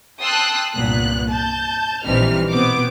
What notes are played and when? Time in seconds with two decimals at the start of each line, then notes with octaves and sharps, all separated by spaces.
0.22 G5 A5 C6 D#6 E6 F#6
0.75 C2 G2 A#2 B3 F#6
1.30 A5 G6
2.05 A#1 E3 G3 C4 D#4 F6
2.51 B2 B3 C4 D6